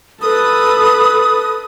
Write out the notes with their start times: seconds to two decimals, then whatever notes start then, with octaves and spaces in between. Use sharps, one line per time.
0.22 A4 B4 D#6